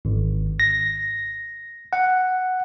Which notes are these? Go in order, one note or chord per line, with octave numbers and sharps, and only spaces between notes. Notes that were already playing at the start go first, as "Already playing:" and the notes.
G#1
A#6
F#5